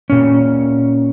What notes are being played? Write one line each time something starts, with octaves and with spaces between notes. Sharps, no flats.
A#2 C#4